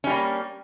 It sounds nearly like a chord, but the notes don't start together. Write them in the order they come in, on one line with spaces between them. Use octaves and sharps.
C#4 G3 A#3